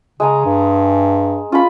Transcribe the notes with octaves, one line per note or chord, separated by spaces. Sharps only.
C#3 G#3 G#5 A#5
G2
C#4 F4 B5